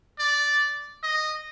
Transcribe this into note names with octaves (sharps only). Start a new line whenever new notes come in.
D5
D#5